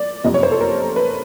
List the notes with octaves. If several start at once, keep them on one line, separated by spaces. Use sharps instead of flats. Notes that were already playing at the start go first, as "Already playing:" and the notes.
Already playing: D5
F#1 F2 C3 D#5
C#5
C5
A4
A#4
B4